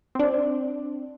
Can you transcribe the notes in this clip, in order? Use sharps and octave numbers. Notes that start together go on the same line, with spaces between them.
C4 D4